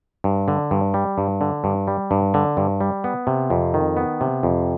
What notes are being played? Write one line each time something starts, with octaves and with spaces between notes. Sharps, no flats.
G2
D3
G2
G3
G2
D3
G2
G3
G2
D3
G2
G3
B3
C3
F2
D#3
B3
C3
F2